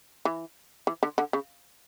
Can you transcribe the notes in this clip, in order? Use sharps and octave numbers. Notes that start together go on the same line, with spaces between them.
E3
E3
D3
D3
C#3